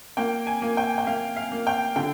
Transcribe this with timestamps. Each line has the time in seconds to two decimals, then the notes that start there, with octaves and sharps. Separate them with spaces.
0.17 A#3 G5
0.47 G#5
0.62 A#3
0.77 G5
0.98 G5
1.07 A#3 F5
1.36 F5
1.52 A#3
1.67 G5
1.96 D3 G5